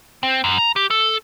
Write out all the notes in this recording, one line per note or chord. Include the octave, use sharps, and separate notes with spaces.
C4
F#2
A#5
G4
A4